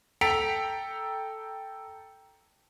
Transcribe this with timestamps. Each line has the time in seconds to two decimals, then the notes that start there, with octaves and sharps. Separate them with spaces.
0.21 A4 G5 A#5 B6 D7 F7